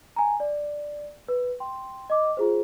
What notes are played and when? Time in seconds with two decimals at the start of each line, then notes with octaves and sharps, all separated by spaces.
0.16 G#5 A#5
0.40 D5
1.28 B4
1.60 G5 C6
2.10 D#5 D6
2.37 F4 G#4 C5